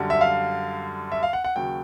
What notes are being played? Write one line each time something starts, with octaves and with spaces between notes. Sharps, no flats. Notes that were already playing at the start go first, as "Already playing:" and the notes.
Already playing: F#2 D3 G3
E5
F5
E5
F5
F#5
F#5
D#2 C#3 F#3 G5